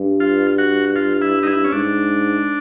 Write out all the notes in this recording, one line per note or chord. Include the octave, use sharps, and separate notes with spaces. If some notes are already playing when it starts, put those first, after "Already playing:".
Already playing: G2
F4
F#4
F4
E4
D#4
E4
C#4
G#2 D4